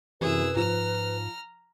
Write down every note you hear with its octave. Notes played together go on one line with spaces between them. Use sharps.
F#2 C3 E3 E4 G#4 B4 E6
G#2 F3 A#5 F6